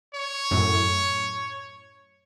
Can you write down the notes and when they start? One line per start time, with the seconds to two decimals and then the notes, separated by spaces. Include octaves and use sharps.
0.14 C#5
0.51 F#2 A2